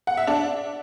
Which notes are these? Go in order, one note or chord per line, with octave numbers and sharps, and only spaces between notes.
F#5
E5
D4